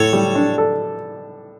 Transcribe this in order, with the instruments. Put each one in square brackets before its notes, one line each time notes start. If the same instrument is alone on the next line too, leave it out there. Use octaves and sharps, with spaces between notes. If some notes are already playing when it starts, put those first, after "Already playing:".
Already playing: [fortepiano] A2 [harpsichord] A4 C#5
[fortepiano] G3
D4
A4